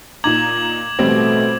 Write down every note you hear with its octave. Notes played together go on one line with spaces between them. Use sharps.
A#2 D#4 A#5 D6 G#6 F#7
A1 B2 G3 A3 C4